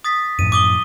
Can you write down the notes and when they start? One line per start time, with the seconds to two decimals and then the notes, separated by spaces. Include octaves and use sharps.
0.04 D#6 A6 B6
0.39 F#2 A2 F3 D#7
0.52 D6 D#6 G7